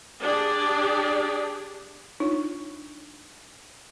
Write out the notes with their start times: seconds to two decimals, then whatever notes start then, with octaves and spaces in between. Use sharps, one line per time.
0.21 D4 G4 G#4 D5
2.20 D4 D#4 F4 C#5